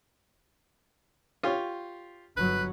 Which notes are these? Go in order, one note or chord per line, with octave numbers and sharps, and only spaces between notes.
F4 G4 C#5
G1 F#3 B4